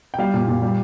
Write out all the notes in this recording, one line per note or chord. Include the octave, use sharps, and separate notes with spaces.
G5
G3 F5
A#2
A#2
G3